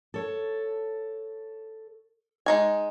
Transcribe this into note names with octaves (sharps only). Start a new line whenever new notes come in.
A4 C#5
G#3 D#4 G#5